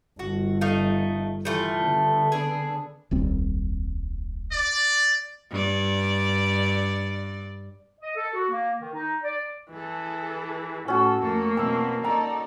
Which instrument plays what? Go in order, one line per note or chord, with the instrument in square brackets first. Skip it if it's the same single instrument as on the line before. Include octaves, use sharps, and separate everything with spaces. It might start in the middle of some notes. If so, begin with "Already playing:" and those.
[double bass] G1 [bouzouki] F#4
[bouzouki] A3 D#4 F5
[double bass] E3 [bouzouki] G3 A3 F4
[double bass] D3 B3
[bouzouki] D4 G#4
[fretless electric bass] D#1 C2 C4
[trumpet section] D5
[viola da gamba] G2 D5
[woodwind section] D#5
A4
F#4
A#3
D#3
D#4
D5
[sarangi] E3 [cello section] G#4 A4
[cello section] A2 [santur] C#4 F#4 [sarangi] A4
[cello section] F2 A3 A4 [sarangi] A#3
[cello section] B2 E3 C4 [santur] A5 E6
[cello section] D#4 A4 D5 [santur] A#5